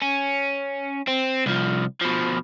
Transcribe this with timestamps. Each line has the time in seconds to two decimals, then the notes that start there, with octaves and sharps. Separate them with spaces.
0.02 C#4
1.08 C4
1.46 C2 F3
2.02 B2 F3